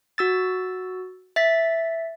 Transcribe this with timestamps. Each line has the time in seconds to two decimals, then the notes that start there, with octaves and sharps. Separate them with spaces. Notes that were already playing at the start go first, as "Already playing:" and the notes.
0.18 F#4 E6 A6
1.36 E5 A6 B6